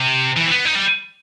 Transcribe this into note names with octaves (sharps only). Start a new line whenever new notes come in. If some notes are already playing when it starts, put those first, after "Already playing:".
Already playing: C3
E3
C4
B3
D#4
G3